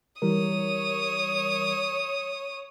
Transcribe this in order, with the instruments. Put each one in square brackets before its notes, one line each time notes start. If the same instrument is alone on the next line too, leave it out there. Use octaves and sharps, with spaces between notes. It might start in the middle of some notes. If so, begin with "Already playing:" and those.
[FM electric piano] E3 G3 A#4 [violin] C#5 D#6